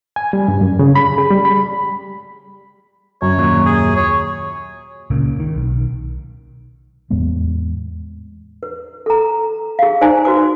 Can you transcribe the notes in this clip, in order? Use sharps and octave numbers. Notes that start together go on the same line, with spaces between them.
G#5
G3
G2
F#2
C#3
B5
G#4
G3
B5
F#2 C#5
D#2 A#2 F#3
G#4
C#5
C#2 A#2 C#3 A#3
D#3
B1
E2 A2 G#3 B3
B4
A4 A#5
G#4 F5
D#4 C5 D5 G#5 A#5
F#4 B4 C5 D6